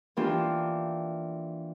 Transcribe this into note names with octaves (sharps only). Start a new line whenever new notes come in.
E3 A#3 D4 F4 G4